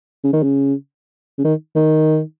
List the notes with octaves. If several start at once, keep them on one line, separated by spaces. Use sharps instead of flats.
C#3
D#3
C#3
C#3
D#3
D#3